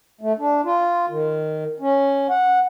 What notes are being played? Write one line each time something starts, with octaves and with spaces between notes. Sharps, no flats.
A3
D4
F4
D#3
C#4
F#5